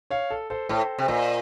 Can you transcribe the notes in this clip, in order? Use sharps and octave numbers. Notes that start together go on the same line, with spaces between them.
C#5 F5
A4
A4 C5
A2 A4 C5
C3
A#2 C5 D#5